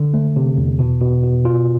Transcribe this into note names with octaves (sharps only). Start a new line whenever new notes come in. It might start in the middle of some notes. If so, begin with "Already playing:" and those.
Already playing: D3
A3
C3
E2
B2
B2
B2
F4